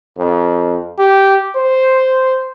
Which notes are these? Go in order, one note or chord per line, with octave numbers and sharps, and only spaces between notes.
F2
G4
C5